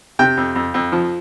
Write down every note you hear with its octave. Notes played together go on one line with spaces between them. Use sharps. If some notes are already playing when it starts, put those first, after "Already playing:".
C3 G5
F2
F2
F2
F3